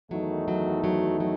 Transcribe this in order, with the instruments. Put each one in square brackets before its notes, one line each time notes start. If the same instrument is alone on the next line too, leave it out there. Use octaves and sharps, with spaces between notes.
[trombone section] E2 D#3 A3 D#4 [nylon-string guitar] F#3
[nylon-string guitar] F#3
F#3
F#3